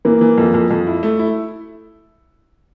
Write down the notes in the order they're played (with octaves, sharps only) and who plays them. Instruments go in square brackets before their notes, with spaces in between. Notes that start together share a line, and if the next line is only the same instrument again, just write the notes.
[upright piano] E3 [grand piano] A#3
[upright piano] E3
F2
F2
F2
E4
A3
E4